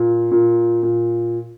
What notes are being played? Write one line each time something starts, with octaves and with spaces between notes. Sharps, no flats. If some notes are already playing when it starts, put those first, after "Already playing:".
Already playing: A#2
A#2
A#2